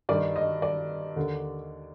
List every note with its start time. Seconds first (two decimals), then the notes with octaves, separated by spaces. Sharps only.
0.09 G2 D#3 D5
0.36 D#5
0.62 D5
1.16 D#2 D3